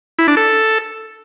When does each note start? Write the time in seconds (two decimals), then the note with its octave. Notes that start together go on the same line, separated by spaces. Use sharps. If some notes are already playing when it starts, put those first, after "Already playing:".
0.19 E4
0.28 D4
0.37 A4